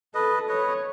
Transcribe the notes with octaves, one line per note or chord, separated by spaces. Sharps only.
A4 B4 D#5
B4 C#5 D#5